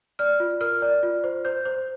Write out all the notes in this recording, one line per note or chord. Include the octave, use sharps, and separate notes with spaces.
D5 F6
F4
A#4 F6
D5
F4
C5
C5 G6
C5